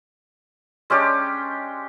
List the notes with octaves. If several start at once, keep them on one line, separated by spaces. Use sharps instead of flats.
G#3 C#4 D4 G4